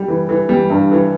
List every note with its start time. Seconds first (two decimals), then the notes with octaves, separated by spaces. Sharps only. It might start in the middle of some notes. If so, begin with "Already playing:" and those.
Already playing: G3
0.08 E3
0.29 E3
0.49 G3
0.70 G2
0.91 E3